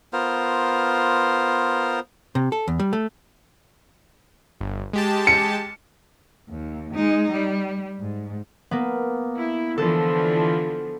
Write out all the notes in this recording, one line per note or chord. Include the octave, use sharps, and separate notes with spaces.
B3 F4 A#4 C5
C3
A4
E2
G3
A3
G1
G#3 G4 A5
C#7
D#2
G#3 D#4
G3
G#2
A#3 B3
E4
D3 E3 F3 A4